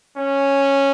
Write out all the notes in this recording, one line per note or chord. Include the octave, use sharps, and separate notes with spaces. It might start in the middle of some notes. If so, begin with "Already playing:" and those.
C#4